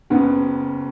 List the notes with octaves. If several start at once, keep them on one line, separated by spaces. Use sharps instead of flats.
F#1 F#2 C#3 B3